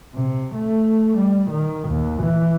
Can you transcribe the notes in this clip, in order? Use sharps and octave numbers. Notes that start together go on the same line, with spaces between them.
C3
A3
G3
D#3
D#2
E3